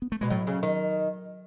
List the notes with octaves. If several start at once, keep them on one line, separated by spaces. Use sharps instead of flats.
B3
A3
B2 G#3
A2 F#3
C#3
D#3